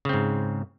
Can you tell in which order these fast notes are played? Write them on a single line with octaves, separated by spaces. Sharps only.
C#3 C4 G#2